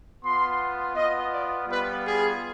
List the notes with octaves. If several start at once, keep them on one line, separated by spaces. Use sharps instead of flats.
B3 F4 C6
B3 F4 D#5
D5
G3 B3 F4 B4
G#4